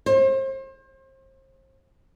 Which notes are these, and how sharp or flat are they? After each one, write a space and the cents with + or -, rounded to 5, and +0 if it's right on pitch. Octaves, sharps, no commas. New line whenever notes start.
C5 +35